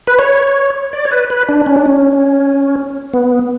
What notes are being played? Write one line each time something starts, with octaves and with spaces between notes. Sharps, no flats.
B4
C#5
D5
C#5
B4
B4
D4
C#4
D4
C#4
B3